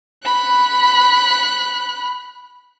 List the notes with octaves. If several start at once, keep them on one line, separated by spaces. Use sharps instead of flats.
B5 F#6